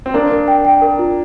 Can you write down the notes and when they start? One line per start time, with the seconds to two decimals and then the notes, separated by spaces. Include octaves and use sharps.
0.06 C4
0.14 A#3 D4 A#4
0.31 A#4
0.48 G5
0.65 G5
0.82 A#4
0.99 F4